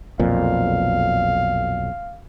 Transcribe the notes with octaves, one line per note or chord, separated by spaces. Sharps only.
B1 F2 A#2 F5